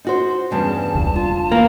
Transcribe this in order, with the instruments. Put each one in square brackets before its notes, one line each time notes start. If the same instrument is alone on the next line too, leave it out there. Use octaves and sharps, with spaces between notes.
[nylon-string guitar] D#4 F#4 C5
[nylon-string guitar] E2 G2 C#3 [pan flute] A5
[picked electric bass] E1 C#2
[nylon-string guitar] F4
[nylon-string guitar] E3 [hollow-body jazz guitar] A#3 [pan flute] F5